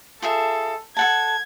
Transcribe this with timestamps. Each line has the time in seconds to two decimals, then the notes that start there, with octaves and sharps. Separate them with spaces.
0.22 F4 G#4 A4 E5
0.97 A4 F#5 A5 G#6